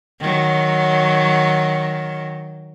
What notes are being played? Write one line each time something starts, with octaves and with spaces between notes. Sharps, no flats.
D#3 F#3